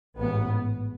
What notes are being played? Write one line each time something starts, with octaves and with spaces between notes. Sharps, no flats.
A1 G#2 B3